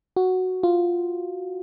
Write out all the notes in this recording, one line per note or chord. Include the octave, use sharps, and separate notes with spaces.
F#4
F4